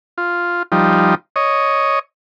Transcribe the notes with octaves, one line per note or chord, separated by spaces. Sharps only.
F4
F3 G3 D#4
C#5 D#5